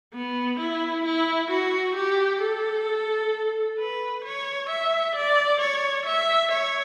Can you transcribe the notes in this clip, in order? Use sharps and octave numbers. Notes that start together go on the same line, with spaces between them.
B3
E4
E4
F#4
G4
A4
B4
C#5
E5
D5
C#5
E5
C#5